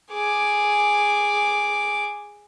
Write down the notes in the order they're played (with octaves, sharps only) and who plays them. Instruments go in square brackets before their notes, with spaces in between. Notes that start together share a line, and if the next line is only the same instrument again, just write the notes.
[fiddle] G#4 D6